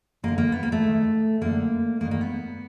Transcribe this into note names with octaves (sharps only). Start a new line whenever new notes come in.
F#2 D3 A#3
A#3
B3
A#3
A3
G#2 D#3
F#2 D3 A#3
G2 D#3 A#3
A#3
B3